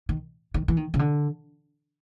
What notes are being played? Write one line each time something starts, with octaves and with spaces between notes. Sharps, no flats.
D#3
D#3
E3
D#3
C#3
D3